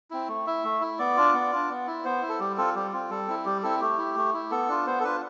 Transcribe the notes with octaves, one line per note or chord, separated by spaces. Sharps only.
C4 E4
A3
E4 E5
A3
E4
B3 D5
D4 F4
B3
D4 F4
B3
E4
B3 C5
E4
A4
G3 G4
C4 F4 A4
G3 G4
C4 F4
G3 A4
C4 E4
G3 G4
C4 E4 A4
A3 G4
E4
A3
E4
B3 A4
D4 F4
B3 C5
A4
D4 F4 B4